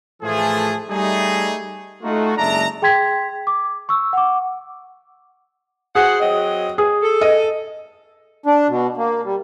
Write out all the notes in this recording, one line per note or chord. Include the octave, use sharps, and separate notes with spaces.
A2 E3 F3 A3 G#4
G3 A3 D#4 G#4
A3 D#4 F4 F#4
F#1 G#3 D4 E5 A#5
G#4 G5 C6 G#6 B6
D6
C#6 E6
F#5 D6
F#4 G#4 C5 F#5
F#3 C4 D#5
G#4
A4
D#5
D4
B2
A#3
G3